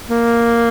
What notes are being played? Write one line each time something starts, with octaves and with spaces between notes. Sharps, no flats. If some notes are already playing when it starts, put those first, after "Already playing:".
A#3